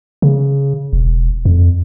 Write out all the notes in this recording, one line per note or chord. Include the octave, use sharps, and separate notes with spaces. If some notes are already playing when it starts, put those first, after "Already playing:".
C#3
E1
F2